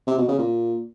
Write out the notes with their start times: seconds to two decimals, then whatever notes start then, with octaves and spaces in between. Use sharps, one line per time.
0.07 C3
0.18 B2
0.28 C#3
0.39 A#2